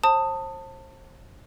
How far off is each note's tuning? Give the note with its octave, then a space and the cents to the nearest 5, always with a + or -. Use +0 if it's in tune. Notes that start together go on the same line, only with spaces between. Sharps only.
C5 +35 A5 +25 D#6 +0